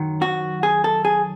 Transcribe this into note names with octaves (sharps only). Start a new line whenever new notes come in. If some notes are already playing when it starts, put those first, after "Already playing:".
Already playing: F#2 D#3 F#3
F#4
G#4
A4
G#4